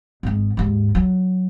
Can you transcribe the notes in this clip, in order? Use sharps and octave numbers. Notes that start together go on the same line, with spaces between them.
G#1 G#2
D#2 G#2
F#3